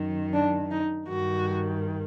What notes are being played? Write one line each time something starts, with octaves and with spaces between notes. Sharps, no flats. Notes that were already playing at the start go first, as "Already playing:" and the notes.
Already playing: F#2 D#3
D4
D#4
G2 D#3 F#4